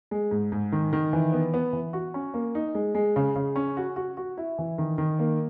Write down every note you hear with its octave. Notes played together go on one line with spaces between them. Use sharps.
G#3
G#2
G#2
D#3
D#3
E3
B3
B3
E3
F#4
C#4
A#3
D#4
G#3
G#3
C#3
C#3
C#4
F#4
F#4
F#4
E4
E3
D#3
D#3
A#3